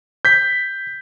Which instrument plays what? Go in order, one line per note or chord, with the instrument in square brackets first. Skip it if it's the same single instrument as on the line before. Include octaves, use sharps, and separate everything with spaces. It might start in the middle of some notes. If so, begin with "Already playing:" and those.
[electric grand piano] G6 B6